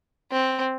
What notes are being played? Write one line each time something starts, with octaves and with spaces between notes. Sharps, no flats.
C4